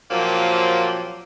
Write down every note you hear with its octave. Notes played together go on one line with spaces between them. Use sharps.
A#2 F3 F#3 A#3 C4 G4